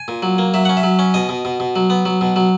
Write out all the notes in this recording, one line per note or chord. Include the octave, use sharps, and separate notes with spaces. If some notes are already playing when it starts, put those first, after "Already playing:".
Already playing: G#5
A#2
F#3
A#3
F#3 E5
C#4 F#5
E5
F#3
C#4
B2 D#5
B2
B2
B2
F#3
B3
F#3
B2
F#3